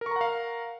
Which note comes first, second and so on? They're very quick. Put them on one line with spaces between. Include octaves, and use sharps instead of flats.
A#4 C#6 A#5 F#5 F5